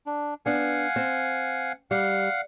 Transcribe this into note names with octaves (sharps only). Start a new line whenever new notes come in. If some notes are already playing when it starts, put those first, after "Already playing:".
D4
B3 D4 F5 F#5 G#5
C4
G3 F5 F#5